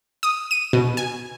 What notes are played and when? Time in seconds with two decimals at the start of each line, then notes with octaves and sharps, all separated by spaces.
0.23 D#6
0.51 D#7
0.73 B2
0.97 G#5